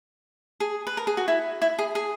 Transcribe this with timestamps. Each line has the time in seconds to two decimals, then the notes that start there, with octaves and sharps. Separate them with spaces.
0.60 G#4
0.87 B4
0.97 A#4
1.07 G#4
1.17 F#4
1.28 E4
1.62 E4
1.79 G#4
1.95 G#4